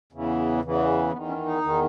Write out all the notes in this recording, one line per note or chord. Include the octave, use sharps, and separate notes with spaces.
E2 C#3 E3
E2 C#3 E3
E2 D#3 B3
C#4
D#4
E2 D#3